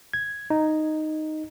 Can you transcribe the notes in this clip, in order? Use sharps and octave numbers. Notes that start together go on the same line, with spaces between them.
G#6
D#4